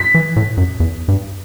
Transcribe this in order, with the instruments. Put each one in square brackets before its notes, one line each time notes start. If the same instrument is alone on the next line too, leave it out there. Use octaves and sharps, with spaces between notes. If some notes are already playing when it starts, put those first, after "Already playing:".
Already playing: [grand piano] B6
[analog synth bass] E3
A2
F#2
E2
G2